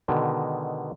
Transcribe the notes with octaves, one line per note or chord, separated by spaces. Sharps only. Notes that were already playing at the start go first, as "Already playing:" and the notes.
B2 D3 D#3 G#3